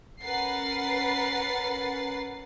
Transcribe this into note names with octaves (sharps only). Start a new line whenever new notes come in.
C#4 A#4 B4 F#5 A6 C7